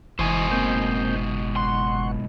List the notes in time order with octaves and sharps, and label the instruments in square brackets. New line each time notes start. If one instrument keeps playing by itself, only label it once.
[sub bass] F#1 [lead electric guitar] G#2 B2 [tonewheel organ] E3 [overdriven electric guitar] C5 G#5
[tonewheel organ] A#3 C4 G6
[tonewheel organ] F#5 C#6 [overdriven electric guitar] C6